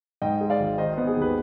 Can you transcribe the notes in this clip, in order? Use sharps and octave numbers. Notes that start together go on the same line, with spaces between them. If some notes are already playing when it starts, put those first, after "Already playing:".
G#2 D#5 G5
G#3
D5 F5
G#1
D#3 C5 D#5
B3 C5 D#5
G#4 C5
D#2 G4 B4